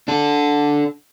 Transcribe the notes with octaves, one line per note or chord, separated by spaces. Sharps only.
D4 A4